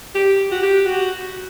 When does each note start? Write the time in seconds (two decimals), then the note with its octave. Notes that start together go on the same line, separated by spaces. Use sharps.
0.15 G4
0.51 F#4
0.62 G4
0.86 F#4